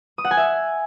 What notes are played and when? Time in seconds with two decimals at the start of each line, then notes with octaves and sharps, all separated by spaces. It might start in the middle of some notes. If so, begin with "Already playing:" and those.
0.18 D#6
0.25 F#5
0.31 G#5
0.37 E5